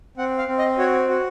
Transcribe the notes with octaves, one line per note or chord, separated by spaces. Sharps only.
C4 F#5
F5
C4
D#5
F#4 C#5
F#4